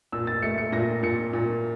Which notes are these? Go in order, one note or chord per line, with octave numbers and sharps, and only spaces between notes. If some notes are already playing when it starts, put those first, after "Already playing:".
A#2 E6
A6
A3 C#7
C#7
A#2 A#6
A#2 C#7
A#2